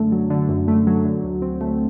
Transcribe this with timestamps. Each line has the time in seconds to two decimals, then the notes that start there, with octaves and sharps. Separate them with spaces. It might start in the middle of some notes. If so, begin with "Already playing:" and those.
Already playing: F#2 D3 A3
0.12 F#3
0.30 D3
0.49 F#2
0.68 A3
0.87 F#3
1.05 D3
1.24 D2
1.42 C4
1.61 A3